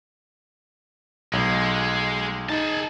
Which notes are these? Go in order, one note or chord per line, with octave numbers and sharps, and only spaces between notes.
B1 G#3
D#4 G#4 A5